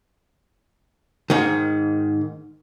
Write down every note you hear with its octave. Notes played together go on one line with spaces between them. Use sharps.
G#2 D#3